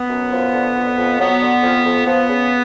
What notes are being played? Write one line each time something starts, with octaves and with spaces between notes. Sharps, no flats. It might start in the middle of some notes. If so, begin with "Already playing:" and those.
Already playing: B3
F#2
F3
D3
F2
F2
F#3 B3
D3
F2
F2
F3 B3
C#3